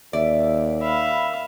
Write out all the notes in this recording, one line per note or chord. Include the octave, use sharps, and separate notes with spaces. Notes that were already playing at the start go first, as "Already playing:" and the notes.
D#2 D5 E5
E5 F5 B5